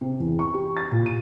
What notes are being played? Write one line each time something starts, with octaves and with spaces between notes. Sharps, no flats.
C3
E2
C#6
G4
A6
A#2
D#7